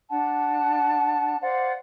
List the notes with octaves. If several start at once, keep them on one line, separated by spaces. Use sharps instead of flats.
D4 F#5 A5
C5 D5 F5 F#5